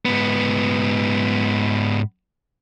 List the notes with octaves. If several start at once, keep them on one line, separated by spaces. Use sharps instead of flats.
G#2 B3